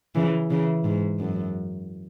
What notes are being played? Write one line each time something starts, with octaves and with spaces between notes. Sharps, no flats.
C#3 E3
C#3 E3
G#2
F#2